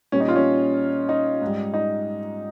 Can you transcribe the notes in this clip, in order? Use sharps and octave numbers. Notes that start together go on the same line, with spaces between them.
A#2 G3 C#4
D#4
F4
C#4
D#4
G#2 G3
D#4